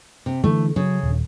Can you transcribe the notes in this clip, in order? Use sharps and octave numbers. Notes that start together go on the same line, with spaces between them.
C3
D3 E3 A3
C#3 F#3
D#1